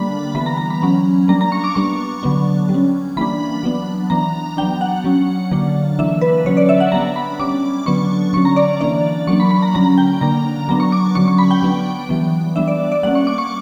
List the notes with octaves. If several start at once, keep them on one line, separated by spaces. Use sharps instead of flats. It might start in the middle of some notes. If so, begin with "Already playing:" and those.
Already playing: D3 G3 A#3 D4 B5
E3 G3 B3 B5
A#5
A#5
B5
F#3 C#4
G3 A#3 D4 A#5
A#5
C#6
D6
G3 B3 D4 C#6
D3 F#3 B3 D4
G3
C#4
E3 G3 A#3 D4 B5
F#3 B3 D4
E3 B3 D4 A#5
F#3 B3 D4 G5
F#5
F#3 C#4
D3 F#3 A#3 D4
E3 A#3 D4 E5
B4
D3 F#3 C#4 C#5
D5
E5
F#5
G3 B3 D4 A#5
B5
G3 C#4 D6
D3 F#3 B3 D4 C#6
D3 F#3 C#4 C#6
A#5
D5
E3 A#3 D4 D5
F#3 A#3 D4 C#6
B5
B5
A#5
D3 F#3 C#4 A#5
G5
D3 A#3 D4 A#5
F#3 B3 D4 A#5
C#6
D6
D3 F#3 C#4 C#6
C#6
B5
G5
F#3 B3 D4
E3 G3 B3
G3 B3 D4 E5
D5
D5
G3 A#3 C#4 F#5
C#6
D6
C#6